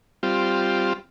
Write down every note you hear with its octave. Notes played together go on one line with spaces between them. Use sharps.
G3 C4 F4